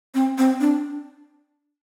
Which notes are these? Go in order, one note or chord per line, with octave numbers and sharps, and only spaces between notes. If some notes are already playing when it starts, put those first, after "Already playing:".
C4
C4
D4